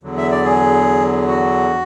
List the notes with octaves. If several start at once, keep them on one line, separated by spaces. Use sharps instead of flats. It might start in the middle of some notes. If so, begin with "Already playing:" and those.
E2 D3 F#3
E5
D5
G#4
F#4